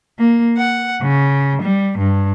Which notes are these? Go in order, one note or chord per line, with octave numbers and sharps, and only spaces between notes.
A#3
F#5
C#3
G3
G2